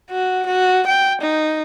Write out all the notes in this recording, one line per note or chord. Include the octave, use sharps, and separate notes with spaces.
F#4
F#4
G5
D#4